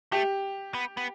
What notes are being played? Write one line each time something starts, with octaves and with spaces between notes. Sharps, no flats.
A3 G4
B3
B3